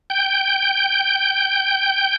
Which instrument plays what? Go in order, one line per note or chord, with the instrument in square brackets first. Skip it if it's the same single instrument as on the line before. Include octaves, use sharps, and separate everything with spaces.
[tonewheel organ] G5 G6